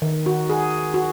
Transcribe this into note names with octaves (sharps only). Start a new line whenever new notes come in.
D#3
F#4
G#4
F#4